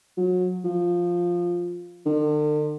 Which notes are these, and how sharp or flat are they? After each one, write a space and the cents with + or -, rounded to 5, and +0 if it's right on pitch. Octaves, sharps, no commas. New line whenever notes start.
F#3 -30
F3 +5
D3 +40